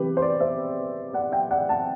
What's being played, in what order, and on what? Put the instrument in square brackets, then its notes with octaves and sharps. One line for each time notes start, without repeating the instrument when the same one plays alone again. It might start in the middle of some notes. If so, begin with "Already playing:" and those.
Already playing: [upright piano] C3 E3 G4 B4
C5
B4 D5
C5 E5
D5 F#5
E5 G5
D5 F#5
F#5 A5